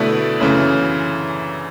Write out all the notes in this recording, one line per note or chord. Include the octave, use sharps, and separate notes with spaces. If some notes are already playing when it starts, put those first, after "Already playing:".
Already playing: B2 D3 A3 E4 B4 D5
F#2 C#3 E3 A3